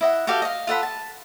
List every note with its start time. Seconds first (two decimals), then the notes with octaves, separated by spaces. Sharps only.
0.01 E4 D#5 F#5
0.27 F#4 G4 A4 F5
0.42 D#5 F5
0.67 F4 A4 F#5 B5
0.83 A5